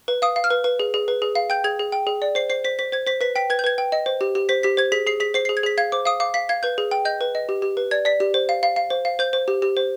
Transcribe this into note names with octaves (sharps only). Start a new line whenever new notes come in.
B4
F5 D#6
F5
F6
B4
B4
G#4
G#4
B4
G#4
F5
G5 G6
G#4 G#6
G#4
G5
G#4
D5
C5 C7
C5 C7
C5 B6
C5 B6
C5 G#6
C5 B6
B4 B6
G5 B6
B4 G#6
G6
B4 G#6
G5
D#5
C5
G4
G4
C5 B6
G4 B6
C5 G#6
G#4 B6
G#4 C7
G#4 B6
C5 C7
G#4 C7
G#6
G#4 B6
F5 G#6
C5 D6
F5 D#6
F5 D6
F5 B6
F5 G#6
B4 G6
G#4
G5
D#5 G6
B4
D#5
G4
G4
B4
D5 G#6
D5 B6
G4
C5
F5
F5
F5
C5
F5
C5 G6
C5
G4
G4
C5